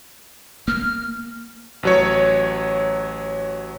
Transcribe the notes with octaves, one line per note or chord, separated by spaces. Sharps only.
A#3 F6
A1 F#3 C#5